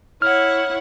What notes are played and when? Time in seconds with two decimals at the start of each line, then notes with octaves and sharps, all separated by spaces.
0.22 E4 C#5 F#5 F6